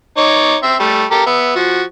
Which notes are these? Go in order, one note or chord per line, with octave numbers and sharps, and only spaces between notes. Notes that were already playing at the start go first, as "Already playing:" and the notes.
D#4 C#5 D6
C4 E5
G3 A3
G4 A4 A#4
B3 E5
F3 F#4